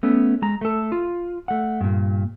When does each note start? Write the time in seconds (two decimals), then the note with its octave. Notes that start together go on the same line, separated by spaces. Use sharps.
0.03 A3 B3 C#4
0.42 G#3 A#5
0.61 A3 A4
0.92 F4
1.48 A3 F#5
1.81 G2 A#2